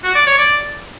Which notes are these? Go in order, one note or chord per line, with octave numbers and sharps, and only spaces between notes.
F#4
D5
C#5
D5